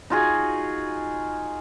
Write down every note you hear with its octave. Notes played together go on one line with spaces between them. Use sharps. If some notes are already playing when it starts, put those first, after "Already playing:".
D#4 F4 F#4 G#4